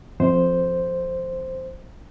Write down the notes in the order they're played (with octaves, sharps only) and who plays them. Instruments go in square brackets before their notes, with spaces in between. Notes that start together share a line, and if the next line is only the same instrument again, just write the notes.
[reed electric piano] F2 C5